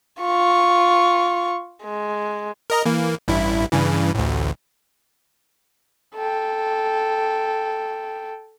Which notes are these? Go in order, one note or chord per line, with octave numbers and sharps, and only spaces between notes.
F4 C#6
G#3
A#4 D#5 A#5
E3 A#3
A1 G2 E4
G2 C#3 E3
A1 D2
A4 G5